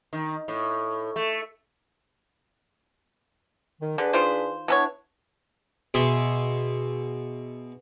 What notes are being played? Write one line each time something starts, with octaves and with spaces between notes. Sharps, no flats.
D#3
A2
A3
D#3
D3 D4 G#4 B4
D#3 F4 C5
E3 B3 D4 A4 C#5
B2 G#4 E5 C6